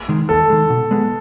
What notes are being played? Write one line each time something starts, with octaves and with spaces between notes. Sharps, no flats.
D#3 G#3
D#2 A4
D#3 G#3
B2
G#3 B3